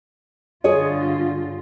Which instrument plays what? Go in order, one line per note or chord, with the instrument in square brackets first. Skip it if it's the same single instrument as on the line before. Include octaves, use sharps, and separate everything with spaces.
[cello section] G2 D3 F4 [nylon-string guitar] G#4 C#5 D#5